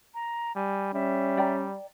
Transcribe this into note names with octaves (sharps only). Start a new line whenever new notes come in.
A#5
G3 G#5
G3 C#4 E5
D5 G5 A#5